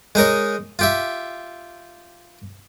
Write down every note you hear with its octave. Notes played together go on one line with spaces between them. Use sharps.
G#3 D#4 A#4 C#5
F4 G4 E5